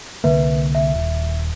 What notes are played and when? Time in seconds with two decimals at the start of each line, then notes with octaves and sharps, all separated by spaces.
0.24 C2 D3 A#3 B4 E5
0.75 E5
0.94 D#1